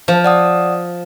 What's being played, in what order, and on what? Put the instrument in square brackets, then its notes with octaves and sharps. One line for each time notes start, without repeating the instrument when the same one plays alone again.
[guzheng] F3
[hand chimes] D5 F#5 D#6